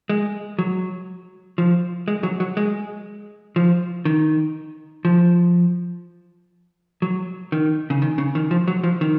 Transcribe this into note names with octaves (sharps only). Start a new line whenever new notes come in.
G#3
F#3
F3
G#3
F#3
F#3
G#3
F3
D#3
F3
F#3
D#3
C#3
D#3
C#3
D#3
F3
F#3
F3
D#3